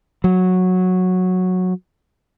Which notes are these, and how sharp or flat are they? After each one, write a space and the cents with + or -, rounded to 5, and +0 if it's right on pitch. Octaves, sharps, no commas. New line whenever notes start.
F#3 -10